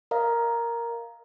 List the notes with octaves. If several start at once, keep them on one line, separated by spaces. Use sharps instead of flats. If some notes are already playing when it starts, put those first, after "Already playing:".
A#4 D#5 F5 A#5